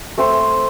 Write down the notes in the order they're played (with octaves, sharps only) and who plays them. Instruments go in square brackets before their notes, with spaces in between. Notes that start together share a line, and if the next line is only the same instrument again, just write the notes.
[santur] A3 C4 A4 C5